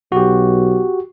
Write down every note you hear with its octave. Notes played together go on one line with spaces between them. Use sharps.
B1 F#4 G4